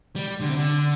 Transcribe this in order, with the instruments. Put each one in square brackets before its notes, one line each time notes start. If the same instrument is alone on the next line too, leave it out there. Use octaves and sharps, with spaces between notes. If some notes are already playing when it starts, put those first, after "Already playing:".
[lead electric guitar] G3
D3
C3
D3